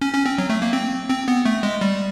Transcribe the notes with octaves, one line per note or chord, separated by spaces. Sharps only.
C#4
C#4
C4
F#3
A3
A#3
C4
C4
B3
A3
G#3
G3